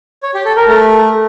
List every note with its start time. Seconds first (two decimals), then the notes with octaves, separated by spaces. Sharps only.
0.23 C#5
0.34 G4
0.45 A4
0.56 A#4
0.68 A3